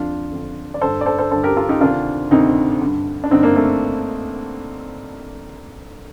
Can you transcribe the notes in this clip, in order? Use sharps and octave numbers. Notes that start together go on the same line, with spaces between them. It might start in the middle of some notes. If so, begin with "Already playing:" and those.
Already playing: F2 D3 D4 F4
F2 D3
D5
G2 D3 A4 C5
D5
A4 C5
A4 C5
G2 D3 A4 C5
G4 A#4
F4 A4
D#4 G4
D2 C3 D#3 D4 F4
D2 C3 D#3 C4 D#4
G2 D3
D4
G2 D3 C4 D#4
A#3 D4
A3 C4